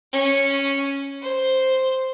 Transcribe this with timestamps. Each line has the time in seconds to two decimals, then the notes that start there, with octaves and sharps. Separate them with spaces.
0.12 C#4
1.22 C5